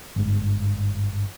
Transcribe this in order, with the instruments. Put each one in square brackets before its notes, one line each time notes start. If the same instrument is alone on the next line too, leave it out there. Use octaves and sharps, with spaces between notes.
[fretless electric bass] G1 G#2